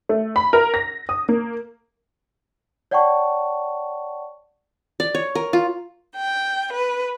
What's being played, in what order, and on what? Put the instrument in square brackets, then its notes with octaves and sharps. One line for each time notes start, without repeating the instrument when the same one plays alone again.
[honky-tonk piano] A3
B5
A#4
A#6
D#6
A#3
[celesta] C#5 D5 F#5 G5 A5 C#6
[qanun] D5
C#5
A#4
F4
[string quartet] G5
B4